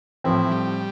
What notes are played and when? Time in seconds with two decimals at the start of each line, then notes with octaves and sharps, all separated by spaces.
0.24 A2 E3 F3 C4
0.51 G3